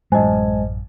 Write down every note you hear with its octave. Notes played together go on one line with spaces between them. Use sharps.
A1 F#2 G#3 C5 D#5 G#5 A5